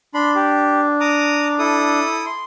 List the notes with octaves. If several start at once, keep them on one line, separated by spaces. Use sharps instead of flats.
D4 B5 C6
G4
A#5 D6 D#6
E4 A4 D#6
C6